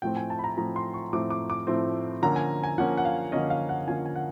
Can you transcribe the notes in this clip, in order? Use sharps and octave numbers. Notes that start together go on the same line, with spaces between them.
A2 F3 A3 C4 G5
G#5
A5
B5
A#5
A2 F3 A3 C4 A#5
C6
C#6
A2 F3 A3 C4 D6
D6
D6
A2 F3 A3 C4
D3 F3 A#3 C#4 A#5
G#5
G#5
D3 F3 A#3 C#4 F#5
F#5
F5
D3 F3 A#3 C#4 D#5
F5
F#5
D3 F3 A#3 C#4 G#5
G#5
F#5